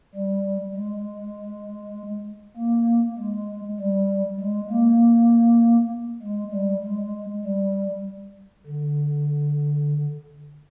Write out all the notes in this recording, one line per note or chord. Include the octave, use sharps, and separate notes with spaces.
G3
G#3
A#3
G#3
G3
G#3
A#3
G#3
G3
G#3
G3
D3